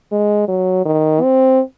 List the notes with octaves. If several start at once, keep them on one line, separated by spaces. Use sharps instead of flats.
G#3
F#3
D#3
C4